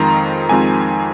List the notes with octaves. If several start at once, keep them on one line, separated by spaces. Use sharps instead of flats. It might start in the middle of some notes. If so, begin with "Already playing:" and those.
Already playing: F2 D#3 G#3 C4 F4 A#5
F2 D#3 G#3 C4 F4 G#5